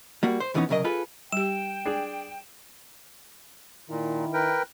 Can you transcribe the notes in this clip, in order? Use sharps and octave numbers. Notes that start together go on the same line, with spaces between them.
G3 A#3 F#4
C5
F2 E3 G3 B3 C#4 D#4
C2 F#2 C#3 F#3 A#4 D#5
F4 G#4 A4 B4
G3 G4 G5 E7
D4 G#4
A#2 D#3 E4
A#4 B4 G5